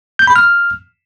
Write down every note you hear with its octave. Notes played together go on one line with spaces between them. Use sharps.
G6
B5
F6